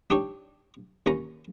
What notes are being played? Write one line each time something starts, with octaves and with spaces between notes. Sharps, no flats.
D4 D#4 G4 C#5
D#2 C#4 A#5